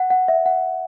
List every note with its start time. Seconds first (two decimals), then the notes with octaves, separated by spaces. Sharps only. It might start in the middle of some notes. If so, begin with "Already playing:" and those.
Already playing: F#5
0.10 F#5
0.28 E5
0.46 F#5